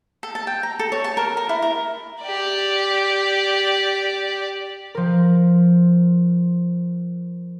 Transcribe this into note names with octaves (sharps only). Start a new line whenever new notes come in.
A4
A5
G5
A#5
A4
C#5
A5
A#4
A#4
E4
A#4
G4 D5
F3 A#4